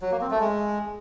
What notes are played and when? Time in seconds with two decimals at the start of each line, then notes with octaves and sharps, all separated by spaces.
0.02 F#3
0.11 A#3
0.21 C4
0.31 A3
0.40 G#3